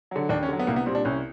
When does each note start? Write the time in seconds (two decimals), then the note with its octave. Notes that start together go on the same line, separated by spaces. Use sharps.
0.11 D3 F#3
0.29 D#2 D4
0.43 C#4
0.49 D3 F#3
0.59 B3
0.67 C2 A#3
0.76 B3
0.86 A#2 G3 C4
0.95 D4
1.05 C2 C#4